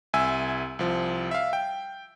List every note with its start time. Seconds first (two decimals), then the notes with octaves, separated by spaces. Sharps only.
0.14 C2 E5 G#5 E6
0.79 C2 F3
1.31 E5 F5
1.53 G5